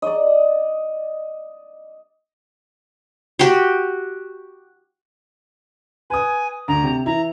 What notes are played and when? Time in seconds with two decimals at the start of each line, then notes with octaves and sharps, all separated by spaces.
0.02 D5 D#5
3.39 F#4 G4
6.10 B4 G#5 D#6
6.68 D2 A#5
6.83 C3
7.06 E3 E4 A#5